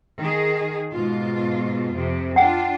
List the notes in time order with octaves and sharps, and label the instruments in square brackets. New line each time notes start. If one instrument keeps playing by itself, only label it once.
[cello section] D#3 G#4
G#2 B2 F4
F2 C3
[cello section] D4 F4 [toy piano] F#5 G5